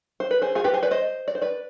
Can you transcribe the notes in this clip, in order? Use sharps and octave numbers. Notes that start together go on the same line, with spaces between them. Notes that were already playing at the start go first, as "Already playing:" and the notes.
C5
B4
G#4 C5
F4 G#4
G4 B4
G#4 C5
B4 D5
C5 D#5
D5
C5
B4 D5